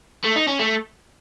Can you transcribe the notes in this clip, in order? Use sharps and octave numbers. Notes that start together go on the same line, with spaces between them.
A3
D#4
C#4
A3